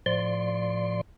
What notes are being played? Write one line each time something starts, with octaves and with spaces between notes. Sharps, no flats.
A2 F3 D5 C6